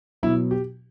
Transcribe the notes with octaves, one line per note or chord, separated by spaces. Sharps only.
B2 F#3 B3 E4
G4